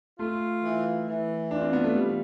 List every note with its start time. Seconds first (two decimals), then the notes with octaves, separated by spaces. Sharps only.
0.19 A3 F4
0.63 E3
1.08 E3
1.51 D4 F4
1.62 C4
1.73 B3
1.84 A3
1.95 E3 G3